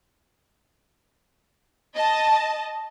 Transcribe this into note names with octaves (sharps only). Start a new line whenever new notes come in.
D#5 A5